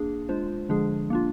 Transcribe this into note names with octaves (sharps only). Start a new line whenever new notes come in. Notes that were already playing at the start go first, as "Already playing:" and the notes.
Already playing: A#3 D4 G#4
G#3 D4 F4 C5
D3 F3 G#3 D4 G#4
A#3 D4 F4